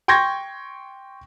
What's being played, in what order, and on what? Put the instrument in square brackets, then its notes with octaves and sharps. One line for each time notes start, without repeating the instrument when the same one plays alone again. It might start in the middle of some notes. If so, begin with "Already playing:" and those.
[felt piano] G5 C6 C#6 G6 G#6 A#6